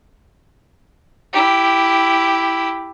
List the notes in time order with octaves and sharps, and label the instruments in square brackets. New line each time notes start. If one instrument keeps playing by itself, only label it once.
[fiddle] E4 G4